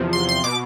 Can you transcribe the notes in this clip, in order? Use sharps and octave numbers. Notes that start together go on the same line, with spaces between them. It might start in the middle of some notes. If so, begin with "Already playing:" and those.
Already playing: E2 C3 F3
C6
C6
B2 D6